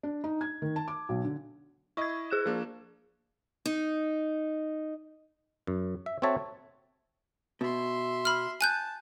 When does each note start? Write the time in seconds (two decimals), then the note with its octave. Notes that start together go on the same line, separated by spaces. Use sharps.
0.03 D4
0.24 D#4
0.41 G#6
0.62 D#3
0.76 A5
0.88 D6
1.09 B1
1.24 D3
1.97 E4 D#5 C#6 G#6
2.30 G#4 F#6 E7
2.46 F3 A#3 D4 G#4
3.66 D#4
5.67 F#2
6.06 E5
6.22 C4 F#4 A4 C#5 E5 A5
7.61 B2 E5 C6
8.25 B5 F6
8.61 G#5 A5 F#6 G6